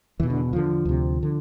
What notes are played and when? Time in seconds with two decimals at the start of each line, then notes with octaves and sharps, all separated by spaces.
0.20 E2 B2 E3
0.30 D3
0.53 E2 D3 F3
0.85 D2 C3
1.23 D3